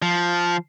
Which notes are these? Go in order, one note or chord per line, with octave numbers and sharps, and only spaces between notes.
F3